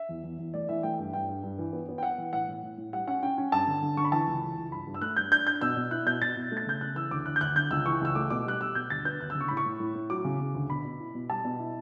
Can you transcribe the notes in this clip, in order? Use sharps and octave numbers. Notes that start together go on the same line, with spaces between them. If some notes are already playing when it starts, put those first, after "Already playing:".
Already playing: E5
E2
E2
E2
A3 D5
E3 E5
A3 G5
G2
G2 G5
G2
G2
E3
B3
B3
G5
B3 F#5
E3
A2 F#5
A2
A2
A2
G3 F#5
C#4 F#5
C#4 G5
C#4
G2 A5
D3
D3
D3 C#6
B5
E3 A5
C#2
E3
C#2
G2 B5
G2
E6
A3 F#6
G2 G6
D4 G6
D4 G6
B2 E6
B2
E4 F#6
B2 G6
B2 A6
B2
A3
A6
C#3 G6
C#3 F#6
E3 E6
D2 D6
D2 F#6
G6
D2 F#6
D3 G6
C#2 E6
E3 C#6
C#2 E6
A3 D6
B2 D6
G3 F#6
G3 E6
B2 G6
D2 A6
B3 G6
D2 F#6
E6
C#3
C#6
A2 B5
C#6
A2
A2
A2
F#3 D6
C#3
C#3
D2
B2 B5
B2
E4
B2
G3 A5
B2
E4